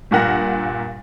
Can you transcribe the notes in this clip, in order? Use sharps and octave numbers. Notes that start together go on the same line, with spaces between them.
G2 A#2 A#4 F#5 A#6